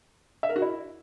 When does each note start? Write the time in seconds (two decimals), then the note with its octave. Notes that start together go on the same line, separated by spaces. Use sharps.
0.43 E5
0.49 A#4
0.56 F#4
0.62 E4